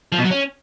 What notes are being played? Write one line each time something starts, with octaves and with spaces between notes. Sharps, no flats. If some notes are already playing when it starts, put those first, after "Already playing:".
F3
B2
F#3
C#4